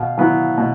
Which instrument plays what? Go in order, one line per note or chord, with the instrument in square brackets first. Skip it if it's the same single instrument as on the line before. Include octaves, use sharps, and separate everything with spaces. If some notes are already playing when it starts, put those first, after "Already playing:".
Already playing: [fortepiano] B2 F5
F#3 B3 E4
B2